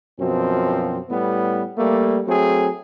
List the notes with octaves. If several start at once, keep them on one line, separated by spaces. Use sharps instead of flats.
F#2 B2 F3 C4
A2 G3 B3
G3 A3 A#3
F#3 A3 C4 G#4